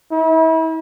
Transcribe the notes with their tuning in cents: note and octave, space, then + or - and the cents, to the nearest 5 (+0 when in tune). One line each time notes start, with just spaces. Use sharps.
E4 -35